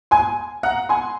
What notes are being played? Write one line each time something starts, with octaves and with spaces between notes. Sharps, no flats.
G#5 C6
F#5 A#5
G#5 C6